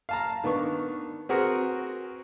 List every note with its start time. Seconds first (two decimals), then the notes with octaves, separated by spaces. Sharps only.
0.09 F5 A5 A#5
0.44 D#3 B3 D4 C#6
1.29 C4 F#4 G#4 A#4 B4 F#5